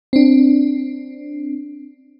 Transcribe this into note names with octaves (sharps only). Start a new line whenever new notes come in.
C4 D4